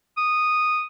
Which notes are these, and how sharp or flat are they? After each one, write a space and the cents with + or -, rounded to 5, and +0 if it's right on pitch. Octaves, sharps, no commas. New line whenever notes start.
D#6 -10